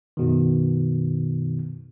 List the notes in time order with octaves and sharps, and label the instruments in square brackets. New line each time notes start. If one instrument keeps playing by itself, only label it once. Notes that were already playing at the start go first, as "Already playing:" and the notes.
[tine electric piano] F#2 B2 D#3